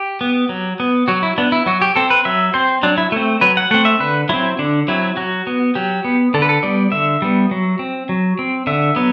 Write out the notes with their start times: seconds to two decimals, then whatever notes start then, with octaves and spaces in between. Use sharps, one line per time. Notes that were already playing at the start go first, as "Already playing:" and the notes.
Already playing: G4
0.21 B3
0.49 F#3
0.80 B3
1.08 F#3 F#4
1.23 E4
1.38 B3 D4
1.52 E4
1.66 F#3 F#4
1.82 G4
1.96 C4 A4
2.10 B4
2.25 F#3 E5
2.54 C4 C5
2.83 F#3 D4
2.97 E4
3.12 A3 C4
3.41 F#3 B4
3.57 F#5
3.71 A3 C4 F#5
3.85 E5
4.00 D3 B4
4.29 F#3 C4 E4
4.59 D3 D4
4.88 F#3 C4 E4
5.17 F#3 F#4
5.47 B3
5.75 F#3 G4
6.05 B3
6.34 D3 A4
6.42 B4
6.49 A4
6.63 G3 B3 D5
6.92 D3 E5
7.22 G3 B3
7.51 F#3
7.79 C4
8.09 F#3
8.39 C4
8.67 D3 E5
8.96 F#3 B3